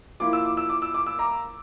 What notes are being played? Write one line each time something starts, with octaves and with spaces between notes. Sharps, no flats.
F3 A#3 E4 D6
E6
D6
E6
D6
E6
D6
E6
A#5 D6